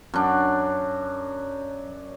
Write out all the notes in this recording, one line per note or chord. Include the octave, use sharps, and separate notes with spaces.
F#2 D4